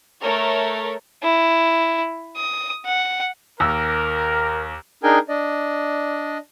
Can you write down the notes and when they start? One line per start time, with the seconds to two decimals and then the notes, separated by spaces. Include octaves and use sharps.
0.21 A3 A#4 C#5
1.23 E4
2.36 D#6
2.85 F#5
3.60 D#2 A#4 E6
5.03 D4 D#4 G#4 A#4 G5 G#5
5.29 D4 D5 D#5